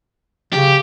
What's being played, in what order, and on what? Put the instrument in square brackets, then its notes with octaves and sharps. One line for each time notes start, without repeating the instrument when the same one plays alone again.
[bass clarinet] C#3 [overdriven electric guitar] G4